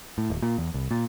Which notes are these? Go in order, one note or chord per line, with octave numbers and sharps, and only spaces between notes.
A2
D#1
A#2
E2
C2
A#2